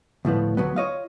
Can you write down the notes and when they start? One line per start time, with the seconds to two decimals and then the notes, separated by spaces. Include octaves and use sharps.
0.25 D2 A2 F3 B3
0.57 D2 F#3 B3
0.76 F4 C#5 D#5 F5